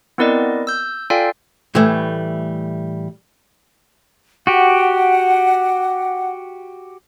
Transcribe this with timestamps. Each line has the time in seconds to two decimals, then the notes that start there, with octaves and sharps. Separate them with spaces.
0.18 B3 C4 E4 A#4 D5 D#5
0.67 E6 G6
1.10 F4 A4 D5 F5 G5 G#5
1.75 A2 E3 G3 A3
4.47 F#4 G4 F#5